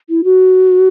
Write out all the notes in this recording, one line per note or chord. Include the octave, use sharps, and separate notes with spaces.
E4
F#4